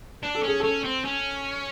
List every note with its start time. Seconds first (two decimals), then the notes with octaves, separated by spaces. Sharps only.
0.23 D4
0.35 A4
0.43 C#4 G#4
0.60 C#4 A4
0.85 C4
1.05 C#4